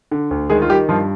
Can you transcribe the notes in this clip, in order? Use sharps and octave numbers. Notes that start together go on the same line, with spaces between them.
D3
D2
D#3 G#3 G#4
F4
D#3 G3 G4
G2 F3 F4